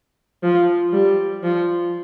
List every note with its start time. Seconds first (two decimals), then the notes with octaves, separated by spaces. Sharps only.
0.43 F3
0.93 G3
1.43 F3